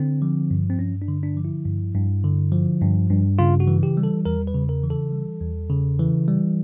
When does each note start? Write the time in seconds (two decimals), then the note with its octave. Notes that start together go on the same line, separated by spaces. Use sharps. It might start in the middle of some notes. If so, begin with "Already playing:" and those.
Already playing: D3 C4
0.22 F3
0.51 G2
0.70 C4
0.79 G2 C#4
1.02 D4
1.08 D3
1.23 D4
1.37 F3
1.45 E4
1.65 G2
1.95 G2
2.24 D3
2.52 F3
2.81 G2
3.10 G2
3.39 C#3 F4
3.60 F#4
3.67 E3
3.83 G4
3.97 G3
4.03 A4
4.25 E2 A#4
4.47 B4
4.55 C#3
4.69 A#4
4.83 E3
4.90 A4
5.12 G3
5.40 E2
5.70 C#3
5.99 E3
6.28 G3